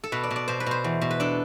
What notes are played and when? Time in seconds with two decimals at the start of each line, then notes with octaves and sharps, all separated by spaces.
0.04 A4
0.12 B2 B4
0.23 D5
0.30 B2
0.36 D5
0.48 B2 C5
0.60 B4
0.66 B2 C5
0.84 E2
1.01 B2
1.11 B4
1.20 D4 A4